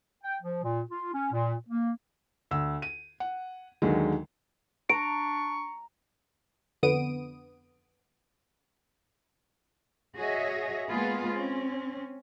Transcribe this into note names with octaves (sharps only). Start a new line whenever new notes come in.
G5
F3
A#2
F4
C#4
A#2
A#3
D2 E6
D#7
F#5
D#2 D3 D#3 F#3 G#3
D4 A#5 C#6 D7
F2 D3 B3 D#6 D7 D#7
F#4 G#4 C#5 D#5 E5
G#3 A#3 B3 F4 G#4 B4
C4 C#4